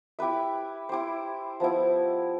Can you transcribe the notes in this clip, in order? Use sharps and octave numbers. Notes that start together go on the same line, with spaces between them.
E4 G4 B4 E5
E4 G4 C5
F3 B3 E4